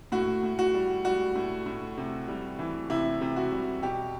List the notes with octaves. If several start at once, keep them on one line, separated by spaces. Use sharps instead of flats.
A2 F#4
A2
F#4
G3
G3 F#4
A2
A2
C3
G3
E3
C3 E4
C3
F#4
G3
B2 G4